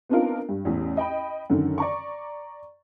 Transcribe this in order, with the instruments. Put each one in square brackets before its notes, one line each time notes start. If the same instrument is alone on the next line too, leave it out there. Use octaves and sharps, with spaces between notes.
[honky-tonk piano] B3 C4 D4 D#4 F4 A#4
G2
A1 E2
D#5 G5 B5
F#2 D3 D#3
D5 A#5 C#6